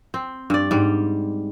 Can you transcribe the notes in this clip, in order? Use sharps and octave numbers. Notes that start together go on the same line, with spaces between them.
C4
G2 D5
G#2 G3